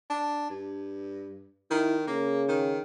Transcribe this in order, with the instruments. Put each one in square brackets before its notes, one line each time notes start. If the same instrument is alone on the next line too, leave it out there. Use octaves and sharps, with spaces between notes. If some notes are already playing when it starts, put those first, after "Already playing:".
[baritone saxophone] D4
G2
[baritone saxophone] D#3 [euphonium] E4
[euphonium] C#3 [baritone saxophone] A#3
[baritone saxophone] D#3